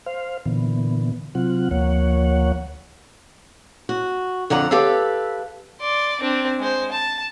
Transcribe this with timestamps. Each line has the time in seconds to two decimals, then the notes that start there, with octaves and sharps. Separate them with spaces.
0.06 C5 F5
0.46 A#2 D3 E3 B3
1.35 C3 F#3 C4 F4 F#5
1.71 D2 F3 A#3 C#5 F#5
3.89 F#4
4.50 F2 D3 F#5 A#5
4.71 G4 A4 B4 E5 F5
5.81 D5 C6
6.20 C4 D4
6.59 G#3 C5
6.92 A5